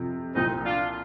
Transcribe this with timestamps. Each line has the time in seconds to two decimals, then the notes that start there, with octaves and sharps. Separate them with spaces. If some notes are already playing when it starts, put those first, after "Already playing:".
Already playing: F2 C3 F3
0.35 C2 A#2 F3 C4 D#4
0.64 D4 F4